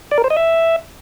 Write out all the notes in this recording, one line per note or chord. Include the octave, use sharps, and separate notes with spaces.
D5
A#4
C5
D#5
E5